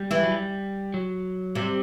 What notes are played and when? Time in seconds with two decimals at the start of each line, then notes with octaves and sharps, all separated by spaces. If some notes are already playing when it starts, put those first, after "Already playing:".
Already playing: G3
0.11 E3 E4
0.23 F#3
0.31 G3
0.94 F#3
1.55 C3 G3 C4